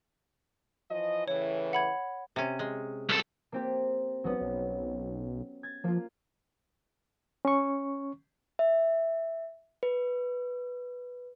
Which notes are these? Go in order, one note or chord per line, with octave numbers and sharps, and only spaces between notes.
E3 F3 D#5
A2 C#3 E3 C#5
F#5 B5 G#6
C3 C#4
G#3
C2 A4
A#3 C4 G4
G#1 F#3 B3 C#4
B1
G#6 A6
F3 A#3 F4
C#4 C#6
E5
B4